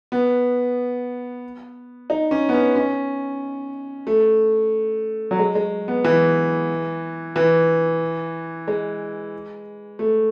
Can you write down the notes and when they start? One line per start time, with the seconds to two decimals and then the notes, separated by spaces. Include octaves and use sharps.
0.12 B3
2.10 D#4
2.31 C#4
2.49 B3
2.53 C#4
2.76 C#4
4.07 A3
5.31 F#3
5.39 G#3
5.55 G#3
5.88 B3
6.04 E3
7.36 E3
8.68 G#3
9.99 A3